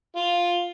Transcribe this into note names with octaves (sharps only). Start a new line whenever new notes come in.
F4